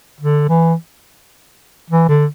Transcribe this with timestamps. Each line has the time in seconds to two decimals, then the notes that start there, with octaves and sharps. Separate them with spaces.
0.21 D3
0.49 E3
1.90 E3
2.09 D3